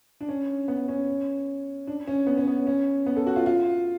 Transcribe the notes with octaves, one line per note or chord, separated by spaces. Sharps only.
D4
C#4
B3
C#4
D4
C#4
B3
C#4
B3
C#4
B3
A4
F#4
F4
F4